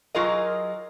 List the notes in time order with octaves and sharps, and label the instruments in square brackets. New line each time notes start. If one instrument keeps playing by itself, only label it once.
[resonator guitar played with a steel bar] F#3 F4 G#4 A#4 D#5